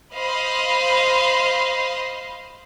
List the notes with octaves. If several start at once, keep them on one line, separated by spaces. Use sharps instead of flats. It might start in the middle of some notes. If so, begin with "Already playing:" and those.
C5 D#5 F5 B5 C6